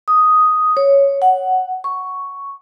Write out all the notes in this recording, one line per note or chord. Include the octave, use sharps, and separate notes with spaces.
D#6
C#5
F#5
C#6